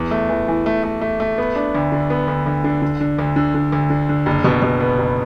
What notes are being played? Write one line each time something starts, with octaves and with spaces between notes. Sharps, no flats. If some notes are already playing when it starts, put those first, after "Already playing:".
Already playing: E2
A3
E3
E3
A3
A3
A3
A3
B3
D4
D2
D3
B3
D2
D2
D3
D3
D3
D2
D3
D3
D2
D3
D3
F#1
B2
B2
B3
F#1